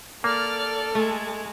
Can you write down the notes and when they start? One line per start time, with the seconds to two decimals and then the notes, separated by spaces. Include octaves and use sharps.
0.24 A#3 A4 D5 F6
0.95 G#3 A3